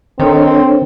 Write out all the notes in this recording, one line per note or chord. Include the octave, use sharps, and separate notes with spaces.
D#3 C4 D4 A4 C#5